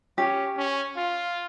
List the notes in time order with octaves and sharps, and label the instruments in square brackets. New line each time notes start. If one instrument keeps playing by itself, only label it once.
[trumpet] C#4 [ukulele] G4
[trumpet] C#4
F4